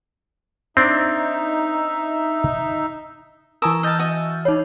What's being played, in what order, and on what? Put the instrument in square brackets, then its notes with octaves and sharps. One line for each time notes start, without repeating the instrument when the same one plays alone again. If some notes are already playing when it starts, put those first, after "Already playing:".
[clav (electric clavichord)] C4 D4 [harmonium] D#4 E5
[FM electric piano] E3 G#5 E6 [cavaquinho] A#4 A5 D#6 [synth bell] C#6
[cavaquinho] D#5 A5 [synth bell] F6 G6 A6
[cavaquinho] F#4 D#5 E5
[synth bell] D#4 C#5